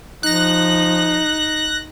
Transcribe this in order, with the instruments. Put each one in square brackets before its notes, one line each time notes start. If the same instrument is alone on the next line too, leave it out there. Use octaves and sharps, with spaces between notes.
[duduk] F3 [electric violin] D#4 [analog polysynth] F#6 A#6